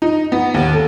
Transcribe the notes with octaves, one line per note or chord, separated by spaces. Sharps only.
D#4
B3
D#2
A4